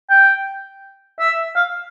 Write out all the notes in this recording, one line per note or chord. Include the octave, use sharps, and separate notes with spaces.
G5
E5
F5